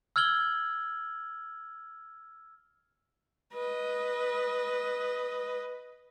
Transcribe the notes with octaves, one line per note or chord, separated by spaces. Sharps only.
E6 F6 G#6 F#7 G7
B4 D#5